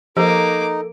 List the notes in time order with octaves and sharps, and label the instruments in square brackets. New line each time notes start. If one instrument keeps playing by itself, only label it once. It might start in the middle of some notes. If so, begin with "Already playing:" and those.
[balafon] F3 G4 C5 [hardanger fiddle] A#3 D6 [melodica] D#4 [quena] A4